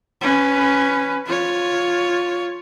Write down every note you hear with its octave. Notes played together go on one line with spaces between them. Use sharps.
C#4 B4
F4 C#5